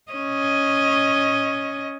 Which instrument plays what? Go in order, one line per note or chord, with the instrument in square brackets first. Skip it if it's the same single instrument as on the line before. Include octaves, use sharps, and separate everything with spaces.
[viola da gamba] C#4 D#5